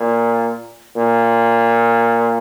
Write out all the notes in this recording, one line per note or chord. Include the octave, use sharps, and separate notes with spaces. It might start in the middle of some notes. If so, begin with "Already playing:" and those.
Already playing: A#2
A#2